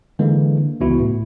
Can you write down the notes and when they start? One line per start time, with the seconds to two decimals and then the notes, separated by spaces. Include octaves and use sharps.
0.19 D3 E3 G#3 A#3
0.80 C#2 E3 B3 E4 F#4
1.00 A2